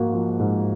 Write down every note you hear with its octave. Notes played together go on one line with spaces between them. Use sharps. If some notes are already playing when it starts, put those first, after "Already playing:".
Already playing: G#2 F3 A#3 F4 F#4
F3
G#2